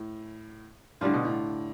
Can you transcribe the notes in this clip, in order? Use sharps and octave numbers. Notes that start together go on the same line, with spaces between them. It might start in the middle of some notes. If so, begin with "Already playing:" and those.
Already playing: A2
A2 D3 G3 D4 F4
B2
A2